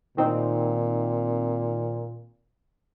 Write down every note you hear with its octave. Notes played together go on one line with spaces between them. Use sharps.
A#2 D#3 C4 D#4